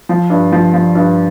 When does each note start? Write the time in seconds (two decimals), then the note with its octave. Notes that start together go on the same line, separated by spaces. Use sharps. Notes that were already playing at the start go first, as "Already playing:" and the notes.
0.09 F3
0.30 G2
0.52 F3
0.74 F3
0.95 G2